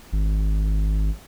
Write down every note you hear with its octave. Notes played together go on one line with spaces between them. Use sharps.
G#1